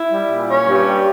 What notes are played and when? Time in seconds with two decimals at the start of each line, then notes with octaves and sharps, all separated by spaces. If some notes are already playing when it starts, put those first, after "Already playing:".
Already playing: E4
0.12 G3
0.31 A#2
0.49 C#4
0.68 G2
0.88 G3